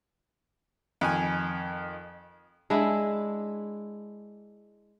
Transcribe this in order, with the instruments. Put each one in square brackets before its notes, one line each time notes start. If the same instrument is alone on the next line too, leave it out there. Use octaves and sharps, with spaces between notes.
[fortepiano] F2 D#3 G#5
[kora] G#3 D4 E4